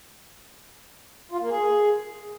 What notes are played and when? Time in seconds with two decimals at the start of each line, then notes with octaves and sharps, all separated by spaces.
1.32 F4
1.41 A#3
1.50 G#4